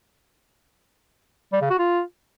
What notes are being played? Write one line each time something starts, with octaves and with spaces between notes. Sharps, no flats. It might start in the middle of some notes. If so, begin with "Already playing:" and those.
G3
C#3
F#4
F4